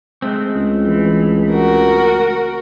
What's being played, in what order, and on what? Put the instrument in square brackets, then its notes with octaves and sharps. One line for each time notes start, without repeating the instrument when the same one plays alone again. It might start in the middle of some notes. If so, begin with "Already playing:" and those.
[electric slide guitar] G#3 A3 C4
[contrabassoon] C#2
[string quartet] E3
F#4 A#4